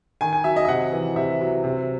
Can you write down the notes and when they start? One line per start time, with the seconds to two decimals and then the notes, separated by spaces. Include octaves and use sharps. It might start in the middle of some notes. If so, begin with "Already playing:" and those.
0.21 D#3 G#5
0.33 G#5
0.44 F#3 E5
0.56 D#5
0.65 E5
0.68 C3 F#5
0.93 E3
1.16 C3 E5
1.41 F#3
1.64 C3